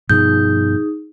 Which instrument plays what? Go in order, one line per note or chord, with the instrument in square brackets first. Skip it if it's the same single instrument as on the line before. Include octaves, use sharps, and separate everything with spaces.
[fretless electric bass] G2 B2 F3 [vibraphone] D#4 G#4 [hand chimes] G6